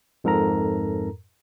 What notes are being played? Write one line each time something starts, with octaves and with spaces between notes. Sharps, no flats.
F2 G#2 A4 A#4 A#5